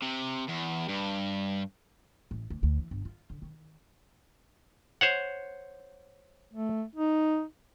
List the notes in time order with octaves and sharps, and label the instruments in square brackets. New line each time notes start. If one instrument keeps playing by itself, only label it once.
[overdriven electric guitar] C3
E2
G2
[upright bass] A1
D2
D2
E3
G1
F4
D3
D#3
[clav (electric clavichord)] C5 C#5 F#5
[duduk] A3
D#4